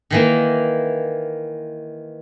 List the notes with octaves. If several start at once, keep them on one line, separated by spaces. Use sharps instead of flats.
D#3 E3 A#3